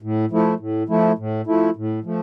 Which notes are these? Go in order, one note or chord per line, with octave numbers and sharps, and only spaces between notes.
A2
F3 A3 E4
A2
F3 A3 E4
A2
F3 A3 E4
A2
F3 A3